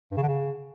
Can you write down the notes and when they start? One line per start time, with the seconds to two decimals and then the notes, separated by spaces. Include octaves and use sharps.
0.12 G2
0.17 C#3
0.23 D3
0.28 C#3